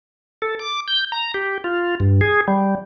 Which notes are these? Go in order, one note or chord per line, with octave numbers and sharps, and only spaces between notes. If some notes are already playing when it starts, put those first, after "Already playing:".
A4
D6
G6
A#5
G4
F4
G2
G#4
G3